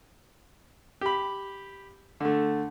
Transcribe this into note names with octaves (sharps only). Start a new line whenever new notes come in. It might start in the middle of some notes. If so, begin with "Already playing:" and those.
G4 B5
D3 A3